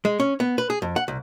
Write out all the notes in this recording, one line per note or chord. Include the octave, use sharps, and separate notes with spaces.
G#3
C#4
B3
B4
G#4
F2
F#5
C2